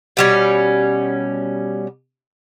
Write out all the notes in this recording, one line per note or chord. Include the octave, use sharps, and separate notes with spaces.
B2 G3 C#4